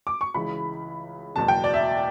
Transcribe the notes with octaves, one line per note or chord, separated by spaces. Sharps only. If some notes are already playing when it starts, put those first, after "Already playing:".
D6
C#6
C#2 C#3 E3 B5
F#1 E2 B2 A5
G5
D5
E5